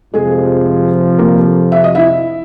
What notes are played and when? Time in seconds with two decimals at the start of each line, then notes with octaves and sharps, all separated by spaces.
0.14 F2 C3 F3 G#3 G#4
1.18 A#3 A#4
1.72 E5
1.84 D#5
1.95 E4 E5